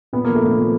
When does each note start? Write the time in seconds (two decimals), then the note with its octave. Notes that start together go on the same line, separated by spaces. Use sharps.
0.13 A#2 B3
0.25 F3 A#3
0.35 A3
0.42 A#2 A#3
0.58 F3